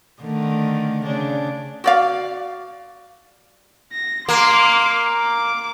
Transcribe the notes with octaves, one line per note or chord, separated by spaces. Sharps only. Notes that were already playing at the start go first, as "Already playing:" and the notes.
D3 D#3 A3
C#3 D4
F#4 D5 F5
A#6
A#3 C6 D6
D6